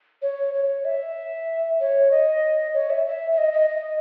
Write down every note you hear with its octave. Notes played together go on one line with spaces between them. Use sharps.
C#5
C#5
E5
C#5
D#5
C#5
E5
E5
E5
D#5
D#5
D#5